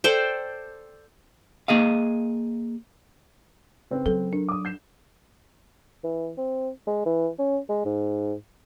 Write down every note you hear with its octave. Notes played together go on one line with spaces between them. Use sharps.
A4 C5 D5 G5
A#3 G#4 D#5 F5
C#3 C4 B4
F#3 A4
D4 A#4
D6 D#6
G6 C7 E7
E3
C4
G#3
E3
C#4
G#3
G#2